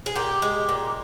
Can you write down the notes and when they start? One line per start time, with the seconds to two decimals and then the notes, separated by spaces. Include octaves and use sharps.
0.06 G#4
0.15 A#2 G4
0.42 G#3
0.69 A#2